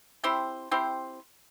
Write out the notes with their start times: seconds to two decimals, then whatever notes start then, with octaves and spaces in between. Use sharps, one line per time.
0.24 C4 E4 G4 C5
0.71 C4 E4 G4 C5